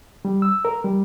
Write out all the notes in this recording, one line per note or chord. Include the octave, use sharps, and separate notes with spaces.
G3
E6
A#4
G3